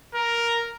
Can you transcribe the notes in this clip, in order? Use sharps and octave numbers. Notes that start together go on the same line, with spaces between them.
A#4